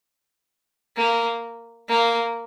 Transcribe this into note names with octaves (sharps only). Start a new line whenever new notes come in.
A#3
A#3